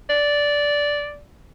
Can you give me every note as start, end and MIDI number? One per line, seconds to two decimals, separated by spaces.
0.09 1.20 74